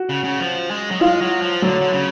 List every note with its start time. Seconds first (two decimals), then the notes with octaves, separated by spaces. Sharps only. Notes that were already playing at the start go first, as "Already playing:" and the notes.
Already playing: F#4
0.09 C#3
0.24 C#3
0.40 F3
0.71 G#3
0.91 F#3
1.01 G#3 F4
1.21 F#3
1.42 F3
1.62 D3 F#3
1.81 D3
1.93 C#3